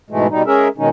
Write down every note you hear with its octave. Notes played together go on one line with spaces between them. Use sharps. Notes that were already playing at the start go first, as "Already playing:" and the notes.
G#2 B2 E3 G#3 A3
B2 G3 D#4
G#3 C#4 G#4 A#4 E5
B2 D#3 G#3 C#4 D#4